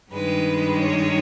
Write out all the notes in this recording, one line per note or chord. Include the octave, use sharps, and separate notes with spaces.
G2 D#3 G#3 B4
C#5